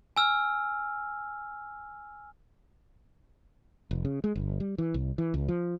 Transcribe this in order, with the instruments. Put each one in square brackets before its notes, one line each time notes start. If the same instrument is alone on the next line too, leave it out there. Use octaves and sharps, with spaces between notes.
[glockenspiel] G#5 E6 F6
[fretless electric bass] F1
C#3
G#3
G1
G3
E3
C2
E3
C#2
F3